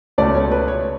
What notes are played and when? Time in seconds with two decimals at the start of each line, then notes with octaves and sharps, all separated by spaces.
0.18 C#2 B2 A3 C#4 D5
0.35 C#5
0.51 B4
0.68 C#5